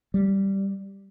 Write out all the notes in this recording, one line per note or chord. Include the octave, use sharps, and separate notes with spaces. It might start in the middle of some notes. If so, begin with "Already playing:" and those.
G3